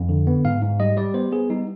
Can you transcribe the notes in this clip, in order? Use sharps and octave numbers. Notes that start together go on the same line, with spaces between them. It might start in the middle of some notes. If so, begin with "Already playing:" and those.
Already playing: F2
D3
B3
G#2 F5
G#2
G3 D#5
G3 D5
B3 C5
B3 G#4
G3 D#4